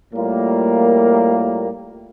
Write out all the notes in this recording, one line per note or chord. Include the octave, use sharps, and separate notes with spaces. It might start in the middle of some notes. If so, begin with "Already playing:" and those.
A2 G3 A#3 F4